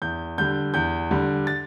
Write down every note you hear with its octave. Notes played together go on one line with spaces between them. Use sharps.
E2 G6
D3 G3 G6
E2 G6
D3 G3
A6